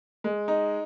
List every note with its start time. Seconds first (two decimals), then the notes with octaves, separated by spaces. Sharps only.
0.24 G#3
0.48 D#4